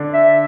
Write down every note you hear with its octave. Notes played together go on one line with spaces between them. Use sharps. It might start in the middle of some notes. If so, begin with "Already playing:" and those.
Already playing: D3 D4
E5